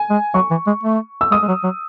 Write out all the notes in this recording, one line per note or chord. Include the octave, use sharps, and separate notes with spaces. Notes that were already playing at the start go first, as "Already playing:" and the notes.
Already playing: G#5
G#3
F#3 C#6
E3
G#3
A3
E6
G#3 D#6
G#3
F#3
F#3